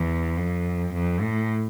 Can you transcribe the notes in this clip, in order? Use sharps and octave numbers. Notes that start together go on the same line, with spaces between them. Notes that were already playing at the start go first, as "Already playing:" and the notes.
Already playing: E2
F2
F2
A2